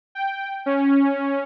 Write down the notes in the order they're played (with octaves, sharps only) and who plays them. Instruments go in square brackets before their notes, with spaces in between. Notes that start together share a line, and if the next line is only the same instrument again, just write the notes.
[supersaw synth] G5
C#4